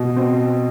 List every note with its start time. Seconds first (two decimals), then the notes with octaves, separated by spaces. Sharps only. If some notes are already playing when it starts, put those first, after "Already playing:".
Already playing: B2
0.16 C4